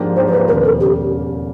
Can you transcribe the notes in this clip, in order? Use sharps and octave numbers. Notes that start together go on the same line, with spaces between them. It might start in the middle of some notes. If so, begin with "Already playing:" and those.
Already playing: G#2 F3 A#3 D4 G4
G#2 F3 A#3 D4 G4 C5
C5
B4
E1 D#2 C#3 A#4
A4
C#3 G4